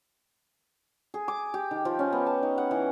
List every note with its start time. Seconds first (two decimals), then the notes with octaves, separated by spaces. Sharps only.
1.14 G#4
1.28 D6
1.54 G4
1.71 D#3
1.85 F3
1.99 C#4
2.12 B3
2.26 A5
2.43 D#4
2.58 F#5
2.71 E3